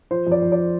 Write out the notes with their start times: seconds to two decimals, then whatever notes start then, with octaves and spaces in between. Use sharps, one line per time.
0.11 F3 C5
0.27 F2
0.32 D5
0.42 F2
0.52 D5